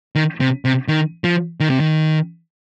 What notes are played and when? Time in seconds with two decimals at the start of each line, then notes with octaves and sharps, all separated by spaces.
0.15 D#3
0.41 C3
0.65 C3
0.88 D#3
1.24 F3
1.60 D#3
1.70 C3
1.80 D#3